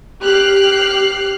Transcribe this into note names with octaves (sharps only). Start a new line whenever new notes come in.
G4 F6 F#6 C7